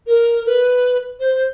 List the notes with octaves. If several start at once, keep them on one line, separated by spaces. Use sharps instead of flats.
A#4
B4
C5